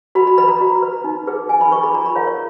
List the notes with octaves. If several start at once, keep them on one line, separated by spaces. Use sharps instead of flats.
F#4 B5
B5
B4 B5
A#5
F#4
B4
D#4
G#4 B4
D#4 G#5
B5
G#4 B4 C#6
B5
F4 A#5
B5
A#4 C#5 F5
C#5